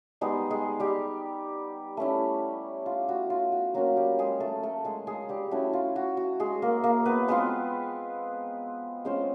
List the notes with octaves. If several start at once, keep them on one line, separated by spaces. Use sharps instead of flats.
G3 G#3 B3 D#4 G#4
G#3 G#4
G3 G4
A3 C#4 E4
F4
F#4
F4
F#4
F#3 A#3 C#4 F4 F#4
G3 G4
G#3 G#4
A3 A4
A3 A4
G#3 G#4
G#3 G#4
G3 G4
A3 C#4 E4 F#4
F4
F#4
F#4
G#3 G#4
A#3 A#4
A#3 A#4
B3 B4
G#3 B3 C4 F4 B4
G#3 C4 C#4 F4 C5